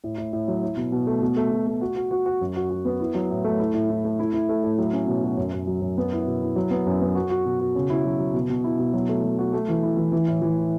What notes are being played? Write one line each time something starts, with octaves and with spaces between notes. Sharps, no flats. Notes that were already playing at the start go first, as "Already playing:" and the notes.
A2
A2
A2
F#3
E4
B2
B2
A3
B2
A3
B2
A3
F#4
F#4
F#4
F#4
F#2
F#4
F#4
B3
E4
F#3
A2
A3
E4
A2
E4
A3
E4
E4
A3
A2
F#3
C#4
B2
F#4
F#2
F#2
F#3
F#2
B3
E4
B2
E4
F#3
B3
F#2
B3
F#4
F#4
B2
F#4
C#3
E4
F#3
F#3
B2
B2
E4
B2
F#3
A3
F#3
F#4
A3
E3
E4
E3
E3
A2
E3
E4